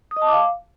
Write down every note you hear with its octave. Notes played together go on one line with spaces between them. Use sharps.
D#6
D#5
A5
D6
F5